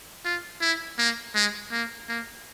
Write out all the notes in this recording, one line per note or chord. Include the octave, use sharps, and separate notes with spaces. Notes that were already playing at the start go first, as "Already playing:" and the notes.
F4
E4
A#3
G#3
A#3
A#3